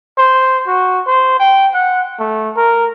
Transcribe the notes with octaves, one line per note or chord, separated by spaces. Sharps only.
C5
F#4
C5
G5
F#5
A3
A#4